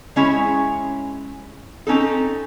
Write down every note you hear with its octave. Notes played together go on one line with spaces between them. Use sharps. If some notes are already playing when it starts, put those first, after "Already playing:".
G#3 C#4 E4 G#4 C#5
C4 C#4 D#4 A4